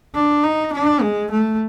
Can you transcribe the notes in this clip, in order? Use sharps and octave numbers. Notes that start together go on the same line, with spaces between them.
D4
D#4
D4
G#3
A3